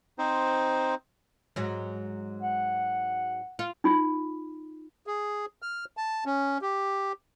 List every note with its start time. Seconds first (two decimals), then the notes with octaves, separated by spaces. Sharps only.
0.18 C4 D#4 C5
1.56 G#2 F#3
2.43 F#5
3.59 F4
3.84 D#4 F4
5.07 G#4
5.62 F6
5.97 A5
6.26 C#4
6.62 G4